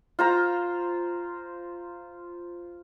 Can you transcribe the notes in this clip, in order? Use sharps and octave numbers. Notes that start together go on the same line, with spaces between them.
F4 C5 A#5